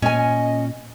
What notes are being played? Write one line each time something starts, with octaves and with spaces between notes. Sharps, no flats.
A#2 C#4 D#5 G#5